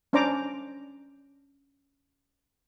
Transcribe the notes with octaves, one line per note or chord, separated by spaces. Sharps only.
C#4 D4 C5 D5 A#5 D6